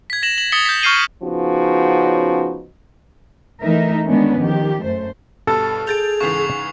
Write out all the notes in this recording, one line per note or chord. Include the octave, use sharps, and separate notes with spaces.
G#6 B6
A#6 E7 F#7
F#7
D#6 A6 B6 C#7 G7
G6 B6
C#6 F6 G6 C7 D#7 G7
C#3 F3 B3 C#4 D#4 F#4
E3 A3 D#4 A#4 E5
D#3 G#3 B3 C#4 D4
D#3 F3 G4
F#2 A3 C5
G2 B2 A4 A6
G#4 G6 A6 D7 F7
G#2 C#3 E3 C#6 C7 F7